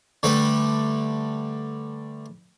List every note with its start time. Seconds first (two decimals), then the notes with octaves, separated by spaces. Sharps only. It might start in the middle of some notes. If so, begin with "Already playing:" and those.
0.23 D3 G3 A3 B4